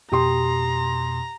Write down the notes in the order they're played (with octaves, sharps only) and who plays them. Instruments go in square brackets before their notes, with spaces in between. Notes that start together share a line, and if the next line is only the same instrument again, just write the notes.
[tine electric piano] F2 B2 D#6 [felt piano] G4 C6 [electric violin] A#5